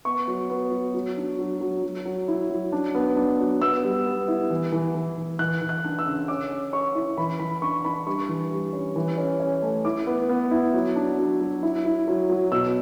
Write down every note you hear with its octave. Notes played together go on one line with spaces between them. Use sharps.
B3 C#6
F#3
B3
F#3
F#3
D4
F#3
F#3
F#3
F#3
E4
F#3
D4
B3
D4
F#3
B3 E6
G3
B3
E4
E3
E3
E3
E3
E3 F#6
E3
F#6
D4
E6
C#3
C#4 D6
C#4
C#4 C#6
E4
E3 B5
E3 B5
D4 C#6
D4 B5
G3 C#6
E3
G3
C#4
E3
C#4
C#4
A3
E4 D6
B3
B3
E4
F#3
D4
F#3
F#3
E4
E4
F#3
F#3
B2 E6